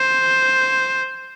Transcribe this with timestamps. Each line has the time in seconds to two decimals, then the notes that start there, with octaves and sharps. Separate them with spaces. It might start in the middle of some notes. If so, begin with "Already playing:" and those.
Already playing: C5